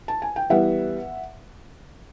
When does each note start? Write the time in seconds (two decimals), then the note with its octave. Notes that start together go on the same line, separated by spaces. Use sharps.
0.08 A5
0.22 G#5
0.36 G5
0.50 E3 G3 B3 E5 F#5